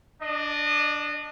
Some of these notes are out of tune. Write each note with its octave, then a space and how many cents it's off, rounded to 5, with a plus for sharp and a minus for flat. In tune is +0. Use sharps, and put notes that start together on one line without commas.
D4 +0 D#5 -30